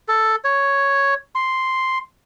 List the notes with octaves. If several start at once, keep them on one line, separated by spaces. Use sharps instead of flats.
A4
C#5
C6